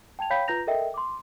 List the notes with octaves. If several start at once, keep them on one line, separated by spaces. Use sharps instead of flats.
G5 A5 G#6 F7
C#5 F5 G5 B5 G6 B6
F4 B4 A#5 G6 A#6 F7
A4 A#4 D#5 E5 G5
C6 D6